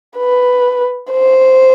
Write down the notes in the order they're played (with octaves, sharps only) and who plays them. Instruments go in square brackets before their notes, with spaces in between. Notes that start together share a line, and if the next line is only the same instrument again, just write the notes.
[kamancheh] B4
C5